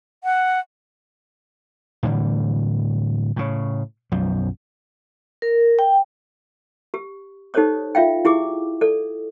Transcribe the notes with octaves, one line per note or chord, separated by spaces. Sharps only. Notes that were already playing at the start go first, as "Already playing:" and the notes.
F#5
A2 D3 E3 G3
A2 C#3
B1 F#2 F3
A#4
G5
G4
D#4 G4 A4 C5 C#5 D#6
F4 E5 F5 G5
E4 G4 G#4 D6
A4 D5